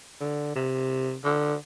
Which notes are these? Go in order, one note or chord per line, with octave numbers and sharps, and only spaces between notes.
D3
C3
D3